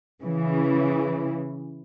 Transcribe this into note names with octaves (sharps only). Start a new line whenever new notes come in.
C#3 E3